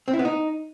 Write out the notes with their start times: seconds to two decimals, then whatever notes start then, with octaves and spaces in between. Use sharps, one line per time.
0.08 C4
0.13 E4
0.19 B3
0.25 D#4